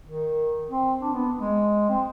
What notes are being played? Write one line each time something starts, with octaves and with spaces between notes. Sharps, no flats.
D#3
C4
D4
B3
G#3
C4